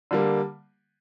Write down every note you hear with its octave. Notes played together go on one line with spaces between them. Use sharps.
D3 G3 A#3